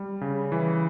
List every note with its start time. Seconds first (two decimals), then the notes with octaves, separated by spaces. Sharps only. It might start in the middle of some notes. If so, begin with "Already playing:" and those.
Already playing: G3
0.21 C#3
0.52 E3